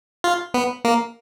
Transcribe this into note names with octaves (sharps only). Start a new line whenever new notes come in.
F4
B3
A#3